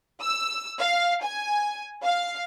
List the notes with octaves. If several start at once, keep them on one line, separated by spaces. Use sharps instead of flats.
E6
F5
G#5
F5